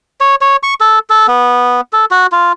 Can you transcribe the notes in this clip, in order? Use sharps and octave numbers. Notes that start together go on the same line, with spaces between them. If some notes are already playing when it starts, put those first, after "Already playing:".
C#5
C#5
C#6
A4
A4
B3
A4
F#4
F4